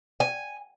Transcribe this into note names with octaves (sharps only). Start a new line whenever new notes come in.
G#5